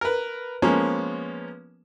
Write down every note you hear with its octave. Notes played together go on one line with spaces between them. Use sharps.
A#4 B4
F3 G#3 A#3 B3 C#4